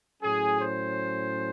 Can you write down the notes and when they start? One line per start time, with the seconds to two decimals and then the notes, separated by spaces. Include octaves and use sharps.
0.21 A2 F#3 C#4 G#4
0.61 C5